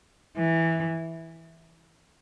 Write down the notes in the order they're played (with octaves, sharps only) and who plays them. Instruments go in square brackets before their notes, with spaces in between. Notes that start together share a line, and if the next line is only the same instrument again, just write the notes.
[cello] E3